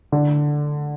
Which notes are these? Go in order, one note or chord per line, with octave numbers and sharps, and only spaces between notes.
D3